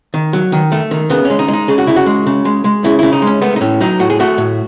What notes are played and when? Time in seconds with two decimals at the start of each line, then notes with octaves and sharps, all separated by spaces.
0.14 D#3
0.33 F#3
0.52 D#3
0.72 A3
0.91 D#3
1.10 C#3 B3
1.25 C#4
1.30 G#3
1.39 D#4
1.48 G#3
1.53 D#4
1.68 C#3 G#4
1.78 F#4
1.87 C#3 E4
1.96 F#4
2.06 G#3
2.27 C#3
2.45 G#3
2.64 G#3
2.84 C#3 E4
2.99 C#3 E4
3.12 D#4
3.22 G#3
3.27 C#4
3.42 A3 B3
3.56 D#4
3.61 A2 C#4
3.81 F#3 D#4
4.00 A2 F#4
4.10 G#4
4.20 A3 F#4
4.38 A2